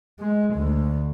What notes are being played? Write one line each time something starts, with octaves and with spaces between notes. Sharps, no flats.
G#3
D2